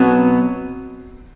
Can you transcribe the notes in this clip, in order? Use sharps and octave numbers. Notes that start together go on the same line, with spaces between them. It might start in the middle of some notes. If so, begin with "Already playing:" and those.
Already playing: B2 F#3 B3 C4